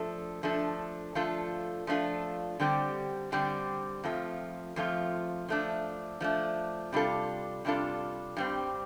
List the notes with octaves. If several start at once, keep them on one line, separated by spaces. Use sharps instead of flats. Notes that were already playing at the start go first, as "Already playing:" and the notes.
Already playing: F3 A3 D4 A4
F3 A3 D4 A4
F3 A3 D4 F4 A4
F3 A3 D4 F4 A4
D3 G3 C4 G4
D3 G3 C4 G4
F2 F3 A3 F4
F2 F3 A3 F4
F3 A3 D4
F3 A3 D4
C3 G3 D4 F4 A4
C3 G3 D4 F4 A4
G2 G3 C4